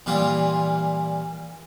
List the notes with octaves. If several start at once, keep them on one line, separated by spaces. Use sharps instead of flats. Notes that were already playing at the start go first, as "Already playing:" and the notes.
A#2 E3 G3 A#3 F4 D#6